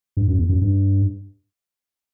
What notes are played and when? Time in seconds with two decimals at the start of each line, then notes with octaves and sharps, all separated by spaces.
0.17 G2
0.28 F#2
0.39 E2
0.49 F#2
0.61 G2